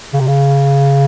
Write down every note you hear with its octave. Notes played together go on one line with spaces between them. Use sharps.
C#3
C3
C#3